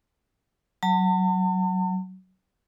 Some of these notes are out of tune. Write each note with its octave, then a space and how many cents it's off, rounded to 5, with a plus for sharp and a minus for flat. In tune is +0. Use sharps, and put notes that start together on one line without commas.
F#3 +15 A5 +45